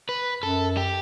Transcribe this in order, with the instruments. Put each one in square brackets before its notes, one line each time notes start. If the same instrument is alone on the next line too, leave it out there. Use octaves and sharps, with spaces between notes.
[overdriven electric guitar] B4
[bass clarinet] F#2 [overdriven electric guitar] A4
[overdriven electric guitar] G4